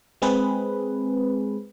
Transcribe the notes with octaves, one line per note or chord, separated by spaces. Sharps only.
G#3 C4 G#4 B4